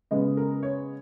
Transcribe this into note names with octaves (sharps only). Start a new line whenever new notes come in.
C#3 G#3 B3 D#5
A#4
C#5